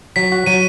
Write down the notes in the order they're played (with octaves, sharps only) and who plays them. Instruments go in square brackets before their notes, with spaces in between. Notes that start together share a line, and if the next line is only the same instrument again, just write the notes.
[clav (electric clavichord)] F#3 [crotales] B6
[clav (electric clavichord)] F#4
[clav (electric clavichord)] F#3 [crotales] D#7